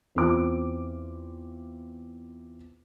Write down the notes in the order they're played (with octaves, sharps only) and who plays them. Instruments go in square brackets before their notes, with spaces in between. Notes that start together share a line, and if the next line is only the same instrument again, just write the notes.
[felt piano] E2 C4 F4 D6